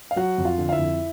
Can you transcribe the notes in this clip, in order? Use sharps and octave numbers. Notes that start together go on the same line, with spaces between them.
F5
F#3 F#4 F#5
F2
F4 F5
D3
F5
E4 E5
F2